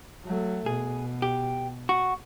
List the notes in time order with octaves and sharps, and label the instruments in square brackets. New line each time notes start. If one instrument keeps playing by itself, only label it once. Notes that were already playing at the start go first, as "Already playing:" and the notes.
[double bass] F#3 A3
[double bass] B2 [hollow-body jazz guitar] G#4
[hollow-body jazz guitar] G4
[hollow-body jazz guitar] F#4 [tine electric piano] C#6